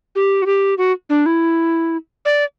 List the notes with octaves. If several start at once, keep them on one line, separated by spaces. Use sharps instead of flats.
G4
F#4
G4
F#4
D4
E4
D5